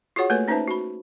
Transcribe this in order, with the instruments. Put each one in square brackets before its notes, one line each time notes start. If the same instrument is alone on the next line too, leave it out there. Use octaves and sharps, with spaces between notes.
[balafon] F4 F#4 G#4 C#5 F#5
A3 A#3 A4 B4 C#5 G#5
C#4 D#4 B4 C5 E5 A5
F#4 B5